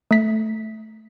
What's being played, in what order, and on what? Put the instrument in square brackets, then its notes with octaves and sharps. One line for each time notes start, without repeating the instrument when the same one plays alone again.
[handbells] A3 B6